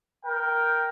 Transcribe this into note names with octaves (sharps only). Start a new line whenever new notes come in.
A#4 G5